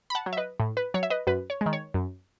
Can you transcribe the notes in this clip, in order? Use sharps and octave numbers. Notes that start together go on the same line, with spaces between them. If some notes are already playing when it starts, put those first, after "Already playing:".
B5
F#5 A5
F#3
E5
B4 D#5
A2
B4
F#3 C#5
E5
B4 D#5
F#2 B4
C#5
G#3
D#3
C#5
F#2